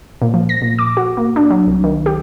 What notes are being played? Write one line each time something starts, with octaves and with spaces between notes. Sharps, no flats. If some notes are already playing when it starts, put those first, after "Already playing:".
A#2
F3
A#6
A#2
D6
F#4
A#3
D4
F#3
C2
D#3
G4